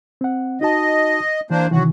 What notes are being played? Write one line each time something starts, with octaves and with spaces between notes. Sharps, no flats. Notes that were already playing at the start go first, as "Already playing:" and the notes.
C4 F#5
D#4 F#4 D#5 A5
E3 A#3 D4 C5
C3 D#3 E3 F#3 F#4